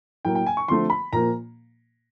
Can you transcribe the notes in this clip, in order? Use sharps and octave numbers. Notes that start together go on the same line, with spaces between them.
A2 F#3 A#3 G5
G5
G#5
C#6
D3 F3 A3 C4 C6
B5
A#2 F3 A#3 A#5